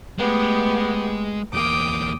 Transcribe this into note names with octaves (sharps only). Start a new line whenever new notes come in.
G#3 A3 B3 G4
E2 A#3 G5 D6 D#6